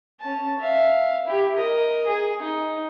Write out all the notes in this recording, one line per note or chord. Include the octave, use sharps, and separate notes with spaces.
C#4 A5
E5 F5
E4 G4
A#4 D#5
G#4
D#4